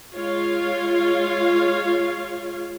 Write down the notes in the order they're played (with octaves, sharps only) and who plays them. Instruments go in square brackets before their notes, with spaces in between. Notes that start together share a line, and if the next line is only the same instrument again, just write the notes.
[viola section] G#3 F4 C#5 F5